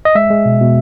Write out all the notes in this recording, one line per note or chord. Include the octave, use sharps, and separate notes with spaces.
D#5
G#3 E5
G#3
B2
B2